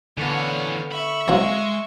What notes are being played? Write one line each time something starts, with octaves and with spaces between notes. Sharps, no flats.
D3 E3 B3 C#5 F5
E5 B5 C#6
F#3 G#3 C4 F5